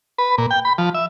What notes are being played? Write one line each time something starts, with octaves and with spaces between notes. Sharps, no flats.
B4
A#2
G5
B5
F3
E5